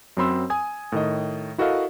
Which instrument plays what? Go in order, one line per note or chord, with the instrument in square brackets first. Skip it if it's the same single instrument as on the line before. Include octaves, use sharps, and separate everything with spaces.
[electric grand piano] F#2 F#3 C4 B5 C6 E6
G#5 D#6 G#6
A2 D#3 D#5
E4 F#4 A4 A#4 D#5 F5